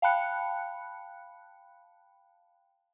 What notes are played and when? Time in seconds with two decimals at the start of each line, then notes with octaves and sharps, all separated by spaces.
0.02 F5 G5 A5 B5 F#6 C#7